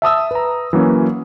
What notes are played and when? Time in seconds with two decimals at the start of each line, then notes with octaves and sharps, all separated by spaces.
0.02 E5 A5 D#6 E6
0.31 B4 A#5
0.73 E3 F#3 A#3 C#4